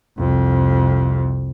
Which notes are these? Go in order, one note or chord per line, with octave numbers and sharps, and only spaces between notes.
C2 F2